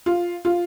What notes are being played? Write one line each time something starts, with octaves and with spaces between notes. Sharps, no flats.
F4
F4